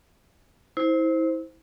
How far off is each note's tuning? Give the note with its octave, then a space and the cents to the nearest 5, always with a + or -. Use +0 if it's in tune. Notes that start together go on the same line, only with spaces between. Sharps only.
E4 -30 C5 +0